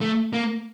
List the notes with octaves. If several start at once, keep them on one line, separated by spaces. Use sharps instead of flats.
A3
A#3